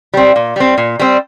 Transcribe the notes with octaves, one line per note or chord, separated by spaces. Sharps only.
G3 C4
A#2
G3 C4
A#2
G3 C4